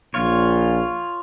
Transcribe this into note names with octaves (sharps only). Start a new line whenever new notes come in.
A#1 F4 C#5